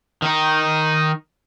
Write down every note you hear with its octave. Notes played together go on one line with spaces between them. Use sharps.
D#3 D#4